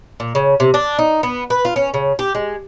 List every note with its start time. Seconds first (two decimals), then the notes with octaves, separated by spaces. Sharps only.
0.20 A#2
0.35 C#3
0.60 C3
0.74 D4
0.99 D#4
1.23 B3
1.50 B4
1.65 F4
1.76 C#4
1.94 C#3
2.19 G4
2.35 G#3